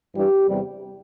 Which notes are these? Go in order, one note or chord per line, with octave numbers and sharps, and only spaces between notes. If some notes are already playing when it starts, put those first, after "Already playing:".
G2 E3 G3 G4
E2 C3 G3